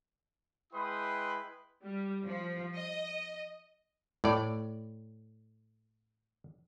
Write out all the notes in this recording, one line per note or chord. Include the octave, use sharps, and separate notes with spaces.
G#3 E4 B4 G5 C6 D#6
G3
F3
D#5
A2 D5